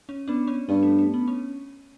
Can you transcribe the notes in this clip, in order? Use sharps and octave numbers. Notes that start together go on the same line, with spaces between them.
C#4
B3 D4
C#4
G2 B3
A3
A3
B3
C#4